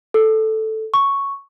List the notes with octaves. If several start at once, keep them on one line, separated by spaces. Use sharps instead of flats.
A4
C#6